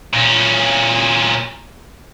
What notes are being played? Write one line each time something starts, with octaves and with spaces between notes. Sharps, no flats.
A#2 C#4